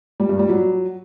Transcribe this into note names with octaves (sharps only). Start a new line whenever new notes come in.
G3
G2
G3
F#3